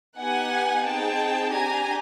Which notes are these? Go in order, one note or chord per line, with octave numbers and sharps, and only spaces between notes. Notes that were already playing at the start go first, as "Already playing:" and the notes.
B3 D#4 G4 F#5 G#5
C4 D#4 G#4 G5 A5
D4 G4 G#5 A#5